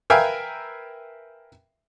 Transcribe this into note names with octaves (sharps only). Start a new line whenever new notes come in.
A#4 B4 E5 F5 G5 G#5